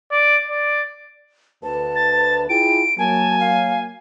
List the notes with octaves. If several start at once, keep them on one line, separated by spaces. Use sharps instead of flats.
D5
D5
D2 B4 A5
A6
E4 F4 G#4 G5 D7
F#3 A#3 G#5 A5
F5